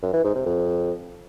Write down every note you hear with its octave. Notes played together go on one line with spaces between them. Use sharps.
F#2
E3
G#2
C3
F2